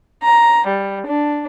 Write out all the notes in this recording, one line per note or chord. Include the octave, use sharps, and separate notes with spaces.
A#5
G3
D4